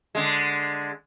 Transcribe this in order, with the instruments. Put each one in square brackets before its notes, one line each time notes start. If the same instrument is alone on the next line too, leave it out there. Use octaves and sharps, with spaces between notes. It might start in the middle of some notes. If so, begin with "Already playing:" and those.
[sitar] D3 G#3